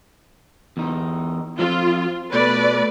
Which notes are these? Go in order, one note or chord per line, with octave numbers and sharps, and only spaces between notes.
E2 D#4
F3 C4 F4
B2 A3 B4 D5